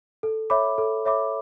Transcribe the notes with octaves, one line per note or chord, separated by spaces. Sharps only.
A4
C#5 E5 B5 D6
A4
C#5 E5 B5 D6